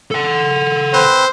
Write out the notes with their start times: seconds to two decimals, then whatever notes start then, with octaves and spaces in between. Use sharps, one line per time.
0.11 A4 F#5
0.93 C4 B4 C5